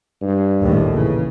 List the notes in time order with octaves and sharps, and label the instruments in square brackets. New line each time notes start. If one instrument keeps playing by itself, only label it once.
[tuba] G2
[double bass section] A#1 D#2 A2
[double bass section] C#3 [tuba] E3